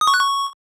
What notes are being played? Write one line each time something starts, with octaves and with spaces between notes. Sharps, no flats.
D#6
C#6
F#6
C#6